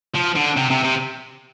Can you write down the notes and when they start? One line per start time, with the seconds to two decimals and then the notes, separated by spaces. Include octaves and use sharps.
0.15 F3
0.36 D3
0.57 C3
0.70 C3
0.84 C3